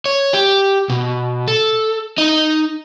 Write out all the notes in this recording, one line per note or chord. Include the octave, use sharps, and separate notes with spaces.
C#5
G4
B2
A4
D#4 D#5